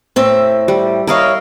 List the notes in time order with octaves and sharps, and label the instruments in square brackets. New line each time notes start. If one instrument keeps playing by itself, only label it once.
[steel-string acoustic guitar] A2 C4 E5
[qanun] G3
[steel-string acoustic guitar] E4 C#5 [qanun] A#4 D#5 F5